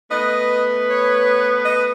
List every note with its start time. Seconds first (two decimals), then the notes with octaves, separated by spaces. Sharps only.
0.11 A3 B3 B4 D#5
0.90 C#5
1.65 D#5